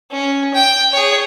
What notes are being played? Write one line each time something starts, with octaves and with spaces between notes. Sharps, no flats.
C#4
G5
G#4 C#5